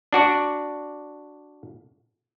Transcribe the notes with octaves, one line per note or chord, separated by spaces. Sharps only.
D4 F#4 D5